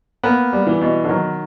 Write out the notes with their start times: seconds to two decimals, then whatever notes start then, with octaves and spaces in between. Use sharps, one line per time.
0.23 A#3 B3
0.53 G3
0.67 E3
0.81 B2
1.04 D3
1.09 D#3 F#3